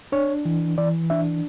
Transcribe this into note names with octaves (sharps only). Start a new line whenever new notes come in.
D4 C#5
E3
E3 D5
D4 E5